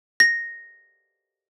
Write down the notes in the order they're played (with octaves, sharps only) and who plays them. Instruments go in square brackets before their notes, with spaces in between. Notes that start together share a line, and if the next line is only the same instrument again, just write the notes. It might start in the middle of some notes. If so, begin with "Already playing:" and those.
[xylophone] A#6